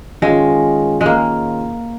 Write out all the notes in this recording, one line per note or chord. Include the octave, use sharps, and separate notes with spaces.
D#3 G#3 C#4 F4 G#4 D#5
G#3
A#3